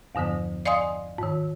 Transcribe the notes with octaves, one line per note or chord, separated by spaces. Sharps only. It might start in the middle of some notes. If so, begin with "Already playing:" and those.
E2 G2 D3 F3 B3
D5 D#5 F5 G#5 C6 D#6
G#2 D#3